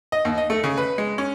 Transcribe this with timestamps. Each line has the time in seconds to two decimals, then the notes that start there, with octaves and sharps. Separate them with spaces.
0.12 D#5
0.25 D#2
0.38 D#5
0.50 A3
0.64 C#3
0.77 B4
0.98 G#3
1.18 C#4